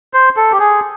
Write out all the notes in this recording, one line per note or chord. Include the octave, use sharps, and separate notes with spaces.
C5
A4
G4
G#4